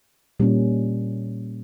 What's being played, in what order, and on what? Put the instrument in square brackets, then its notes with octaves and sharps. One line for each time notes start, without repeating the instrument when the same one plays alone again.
[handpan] A#2 G3 A#3 C#4